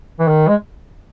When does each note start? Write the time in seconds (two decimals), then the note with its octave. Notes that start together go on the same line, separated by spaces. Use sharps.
0.20 E3
0.28 D#3
0.48 G#3